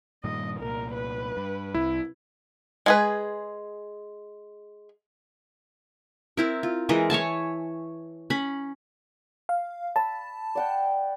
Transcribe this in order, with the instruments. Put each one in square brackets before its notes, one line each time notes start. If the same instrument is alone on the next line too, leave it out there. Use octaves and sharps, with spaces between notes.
[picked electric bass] G2 A#2 D#3 [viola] D#5
[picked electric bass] C2 A#2 [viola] A#4
[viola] B4
[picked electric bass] G2
[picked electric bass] C2 [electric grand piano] E4
[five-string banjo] G#3 G#4 B4
[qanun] C4 E4 A#4
F4
E3 G#3 A#4 D#5
C#5 E5 G#5 A5
C#4 B5
[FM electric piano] F5
[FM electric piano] A5 [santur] B5 E6
[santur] D5 F#5 G5